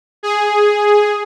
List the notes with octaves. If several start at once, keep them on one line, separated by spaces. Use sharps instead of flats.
G#4